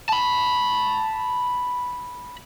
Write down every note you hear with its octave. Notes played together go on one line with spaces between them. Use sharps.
A5 B5